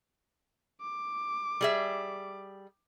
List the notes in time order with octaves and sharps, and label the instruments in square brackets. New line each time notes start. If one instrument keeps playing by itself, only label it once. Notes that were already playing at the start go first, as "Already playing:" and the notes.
[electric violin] D6
[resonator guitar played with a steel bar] G3 G#4 E5